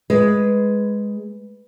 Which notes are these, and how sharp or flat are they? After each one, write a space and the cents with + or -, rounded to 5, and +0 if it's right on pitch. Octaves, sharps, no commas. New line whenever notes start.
G#3 +0 B4 +0